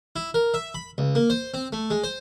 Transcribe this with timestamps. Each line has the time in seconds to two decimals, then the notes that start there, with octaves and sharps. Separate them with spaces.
0.16 E4
0.34 A#4
0.54 E5
0.75 B5
0.98 C#2
1.15 A#3
1.30 C5
1.54 C4
1.73 A3
1.90 G#3
2.04 C5